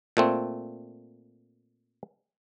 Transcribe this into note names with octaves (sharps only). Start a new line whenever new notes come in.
A#2 A3 C4